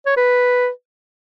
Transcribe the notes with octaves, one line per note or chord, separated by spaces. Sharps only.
C#5
B4